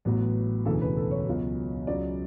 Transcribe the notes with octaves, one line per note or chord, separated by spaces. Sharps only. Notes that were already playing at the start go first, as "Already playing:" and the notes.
A1 A2 F#3 B3
E1 D2 C#3 E3 A4
B4
A4
C#5
C#2 B2 F#3
C#2 C#3 F#3 D5